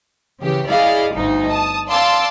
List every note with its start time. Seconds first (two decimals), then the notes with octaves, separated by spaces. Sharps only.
0.40 C#3 E3 G4
0.70 E4 G#4 D5 D#5 F5
1.15 G1 D2 D#4
1.50 A5 D#6
1.89 D5 F5 A5 C6 D6 E6